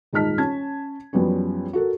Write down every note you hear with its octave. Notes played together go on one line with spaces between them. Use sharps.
D#1 G#2 D#4 A5 F6 B6
C#4 A5 G#6
F#2 F3 G3 B3 C#4
F#4 A4 A#4